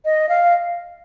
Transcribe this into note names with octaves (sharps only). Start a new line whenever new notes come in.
D#5
F5